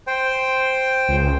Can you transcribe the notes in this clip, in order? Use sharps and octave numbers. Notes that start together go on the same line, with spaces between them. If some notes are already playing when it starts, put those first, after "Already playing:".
C5 G5
C#2